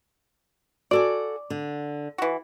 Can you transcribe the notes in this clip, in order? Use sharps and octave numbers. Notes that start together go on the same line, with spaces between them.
F#4 A4 D5 G#5
D3
E3 F#4